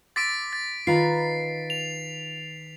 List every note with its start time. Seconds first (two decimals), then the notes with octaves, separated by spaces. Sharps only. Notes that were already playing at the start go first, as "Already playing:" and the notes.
0.16 C6 D6 E6 A6 B6 D7
0.53 A6
0.87 D#3 F4 B4 A#5 C7
1.70 F7